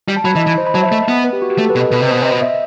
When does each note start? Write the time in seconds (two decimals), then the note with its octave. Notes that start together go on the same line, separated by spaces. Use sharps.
0.08 G3
0.16 A5
0.25 F#3 B5
0.36 E3 D#5
0.47 E3
0.58 C5
0.67 B5
0.75 F#3 A5
0.83 E5
0.92 A3 D#5
1.08 B3
1.24 B4
1.33 G4
1.42 F#4
1.50 G4
1.58 A3 A4
1.70 B4
1.75 B2
1.80 D#5
1.91 B2 B4
2.02 C3
2.08 B2 C5
2.22 C3 D#5
2.31 B2
2.42 E5